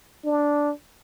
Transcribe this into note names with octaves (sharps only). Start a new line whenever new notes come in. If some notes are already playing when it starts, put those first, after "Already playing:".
D4